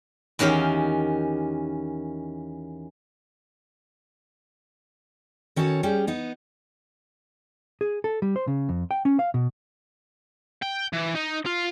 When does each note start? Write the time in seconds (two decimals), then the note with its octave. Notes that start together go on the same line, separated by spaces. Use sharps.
0.39 E2 D#3 C#4 G4 F5
5.56 D#3 C#4 F#4 A4 C#5
5.83 G3 C#4 G4 G#4
6.07 B3 D#4
7.81 G#4
8.04 A4
8.22 G3
8.36 C5
8.48 C#3
8.69 F2
8.91 G5
9.05 C#4
9.19 F5
9.34 B2
10.62 G5
10.93 E3
11.15 D#4
11.46 F4